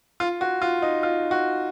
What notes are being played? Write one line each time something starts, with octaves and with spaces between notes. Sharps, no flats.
F4
F#4
F4
D#4
F4
F#4